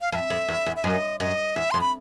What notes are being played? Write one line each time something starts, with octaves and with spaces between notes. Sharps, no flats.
F5
F2 F5
E5
F2
E2
E2
E5
F#2 D#5
F#2 D#5
E2 E5
F2 C6
B5